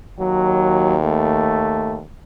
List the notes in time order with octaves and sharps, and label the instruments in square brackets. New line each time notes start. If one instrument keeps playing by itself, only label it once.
[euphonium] D#2 [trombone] F#3
[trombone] A3